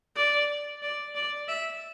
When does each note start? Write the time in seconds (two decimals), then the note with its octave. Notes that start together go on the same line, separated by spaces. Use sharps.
0.16 D5
0.82 D5
1.15 D5
1.48 E5